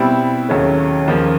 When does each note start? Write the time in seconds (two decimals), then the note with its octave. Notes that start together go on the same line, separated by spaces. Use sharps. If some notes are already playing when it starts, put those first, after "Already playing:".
Already playing: B2 G3 C4 E4
0.49 D#2 C#3 F#3 A3 C#4
1.08 D#2 C#3 F3 A#3